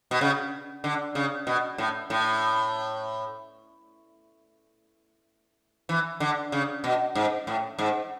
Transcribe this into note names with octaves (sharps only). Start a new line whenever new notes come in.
B2
C#3
D3
C#3
B2
A2
A2
E3
D3
C#3
B2
G#2
A2
G#2